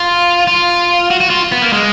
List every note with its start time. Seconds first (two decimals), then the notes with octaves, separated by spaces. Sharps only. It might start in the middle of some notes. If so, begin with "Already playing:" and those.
Already playing: F4
0.47 F4
1.10 F#4
1.20 F#4
1.30 F4
1.52 B3
1.62 A#3
1.73 G#3